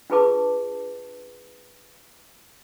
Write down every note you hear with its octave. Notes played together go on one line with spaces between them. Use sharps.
D4 F4 G#4 B4 A5 D6